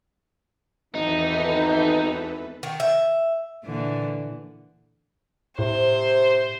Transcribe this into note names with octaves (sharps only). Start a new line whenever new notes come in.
G#1 E2 E3 D#4 A4 B4
D#3
E5
A#2 D3 E3
A2 C3 C5